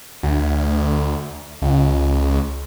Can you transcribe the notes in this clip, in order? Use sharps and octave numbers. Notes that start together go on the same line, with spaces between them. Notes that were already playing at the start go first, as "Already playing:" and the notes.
D2
C#2